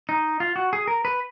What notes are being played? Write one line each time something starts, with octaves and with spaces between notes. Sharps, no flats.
D#4
F4
F#4
G#4
A#4
B4